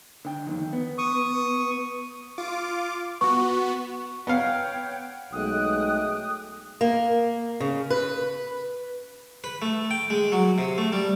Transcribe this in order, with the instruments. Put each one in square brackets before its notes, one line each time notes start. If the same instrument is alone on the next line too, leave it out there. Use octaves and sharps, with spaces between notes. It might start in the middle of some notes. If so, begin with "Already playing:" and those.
[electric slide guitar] D3 G5
F2 G#2 D#3
B3
[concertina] C#6 D#6
[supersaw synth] F4 D6
[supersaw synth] B3 F#4 [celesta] C#6
[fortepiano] B3 F5 [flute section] C#5 G5
[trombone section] B1 G#3 A3 [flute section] G5 F#6 [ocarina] D#6
[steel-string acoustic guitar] A#3
C#3
B4
[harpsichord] B4
A3
G5
G#3
F#3
C3
A3
G3